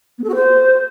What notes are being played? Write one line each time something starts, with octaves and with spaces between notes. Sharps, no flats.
B3
A4
F#4
C5